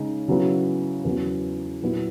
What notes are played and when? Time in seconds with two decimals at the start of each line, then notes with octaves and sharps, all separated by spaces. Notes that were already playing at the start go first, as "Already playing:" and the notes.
Already playing: C#3 G#3 D#4
0.28 C#3 F#3 B3 E4
1.04 E2 C#3 F#3 B3
1.82 A#2 F#3 B3 E4